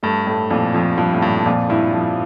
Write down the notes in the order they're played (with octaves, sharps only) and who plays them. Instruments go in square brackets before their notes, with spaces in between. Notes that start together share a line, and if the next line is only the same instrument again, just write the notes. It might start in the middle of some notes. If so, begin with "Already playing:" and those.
[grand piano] G2 [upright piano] A3
[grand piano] A2 [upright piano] A3
[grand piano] F2 [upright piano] A#2
[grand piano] F2 [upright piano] F3
[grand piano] G2 [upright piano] F3
[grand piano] A2
[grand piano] G2 [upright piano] A#2
[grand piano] F2 [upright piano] A#2
[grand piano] G2 [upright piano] E4
[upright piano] F3